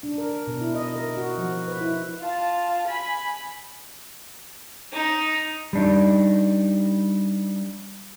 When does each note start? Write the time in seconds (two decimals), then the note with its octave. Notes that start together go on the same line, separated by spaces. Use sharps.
0.03 D4
0.18 A#4
0.47 B2
0.61 E4
0.75 D#5
0.96 A#4
1.17 F#4
1.38 F3
1.68 B4
1.81 E4
2.20 F4 A5
2.87 G#5 B5
4.93 D#4
5.73 G3 D4 D#4